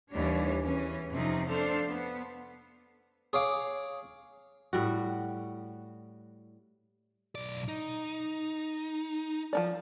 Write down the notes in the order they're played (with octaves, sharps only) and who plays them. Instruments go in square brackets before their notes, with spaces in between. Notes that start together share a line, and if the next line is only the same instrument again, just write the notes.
[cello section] D#2 E3 G3 D4 C#5
E2 E3 C#4
F2 C3 F3 C4 C#4 D#4
A3 D4 A4 C5 F5
B3
[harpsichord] G#4 C#5 F5 D6
[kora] A2 G3 F#4
[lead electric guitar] B1 D5
D#4
[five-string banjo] F3 C#4 D5